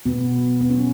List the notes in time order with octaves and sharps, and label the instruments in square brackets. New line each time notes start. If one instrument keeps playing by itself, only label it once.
[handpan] B2 B3
F#3
B3
F#3 C#4